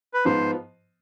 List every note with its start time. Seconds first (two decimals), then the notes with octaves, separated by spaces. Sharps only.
0.14 B4
0.25 G#2 F3 B3 C5